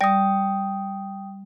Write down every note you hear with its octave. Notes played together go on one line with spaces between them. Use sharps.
G3 D5 G5 D#6